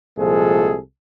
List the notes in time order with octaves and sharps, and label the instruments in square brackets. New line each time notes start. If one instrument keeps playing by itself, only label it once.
[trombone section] C2 A#2 F3 G#3 G#4 A4